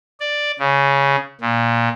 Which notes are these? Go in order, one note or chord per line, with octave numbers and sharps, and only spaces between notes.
D5
C#3
A#2